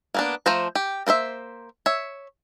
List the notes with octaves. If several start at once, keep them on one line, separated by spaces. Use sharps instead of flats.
A#3 B3 D4
F3 A3 C5 A#5
G4
A#3 A#4 C5 E5
C#5 E5